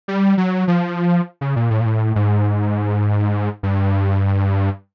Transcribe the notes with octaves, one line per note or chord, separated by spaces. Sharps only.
G3
F#3
F3
C#3
A#2
A2
A#2
A2
G#2
G2